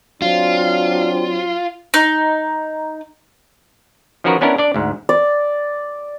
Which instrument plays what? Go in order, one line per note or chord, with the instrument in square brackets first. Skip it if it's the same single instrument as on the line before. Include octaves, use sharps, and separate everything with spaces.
[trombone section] F#3 C4 D4 [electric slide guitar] F4
[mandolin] D#4
[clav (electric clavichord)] D#3 F3 C#4 F#4 A#4 B4
B3 C#4 D4 E4 A#4
D4 D5
D2 G#2
[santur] D5